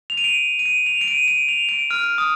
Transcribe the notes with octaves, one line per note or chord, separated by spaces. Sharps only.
F7
D#7
D7
D#7
D7
F7
D7
D#7
D7
F7
D7
F6
D#6